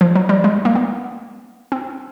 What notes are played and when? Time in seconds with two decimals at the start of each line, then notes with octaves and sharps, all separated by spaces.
0.01 F3
0.15 F#3
0.29 G3
0.44 G#3
0.65 A#3
0.75 B3
1.72 C4